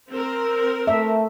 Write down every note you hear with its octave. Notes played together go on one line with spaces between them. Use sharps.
C4 A#4
A3 E5